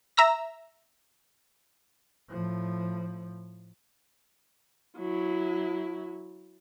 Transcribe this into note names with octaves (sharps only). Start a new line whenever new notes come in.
E5 A#5 E6 A#6
A2 F3
F#3 E4